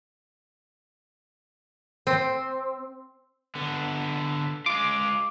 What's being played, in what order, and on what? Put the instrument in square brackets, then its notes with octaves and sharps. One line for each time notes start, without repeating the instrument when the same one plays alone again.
[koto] C4
[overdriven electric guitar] D3 B3
[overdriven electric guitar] G#3 F4 [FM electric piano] D6